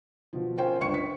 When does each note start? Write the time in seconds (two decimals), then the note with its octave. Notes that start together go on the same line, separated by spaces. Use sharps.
0.33 B2 F3
0.57 C#4 F4 A#4 C5 G5
0.80 G1 C#2 C5 C#6 C#7
0.94 B6